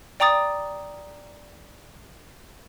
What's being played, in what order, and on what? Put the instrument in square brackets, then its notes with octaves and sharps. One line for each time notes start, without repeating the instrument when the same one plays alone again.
[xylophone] D5 G5 A#5 D6 D#6 A6